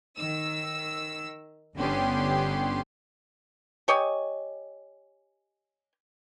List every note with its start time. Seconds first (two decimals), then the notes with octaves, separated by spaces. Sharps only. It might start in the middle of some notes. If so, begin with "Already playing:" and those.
0.17 D#3 E6
1.76 G1 D3 B3 C#4 G4 C6
3.88 G4 C#5 D#5 G#5